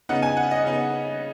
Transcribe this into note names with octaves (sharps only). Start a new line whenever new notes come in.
C#3 B3 D#4 F#5
G#5
F#5
D#5
C#3 B3 D#4